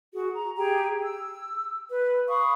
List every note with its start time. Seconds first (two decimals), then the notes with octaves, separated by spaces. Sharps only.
0.14 F#4 G#4
0.34 A#5
0.57 G4 G#4 G5 A#5
1.02 E6
1.90 B4
2.29 F5 B5 C#6 D#6